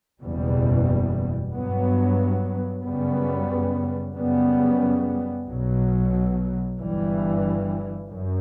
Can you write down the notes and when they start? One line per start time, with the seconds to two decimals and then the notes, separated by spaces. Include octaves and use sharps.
0.21 F#1 E2 B2 G3
1.54 G2 F#3 B3
2.84 F#2 C#3 G3 B3
4.15 F#2 C#3 G3 B3
5.48 B1 B2 F#3
6.78 G1 G2 E3 G3
8.10 F#2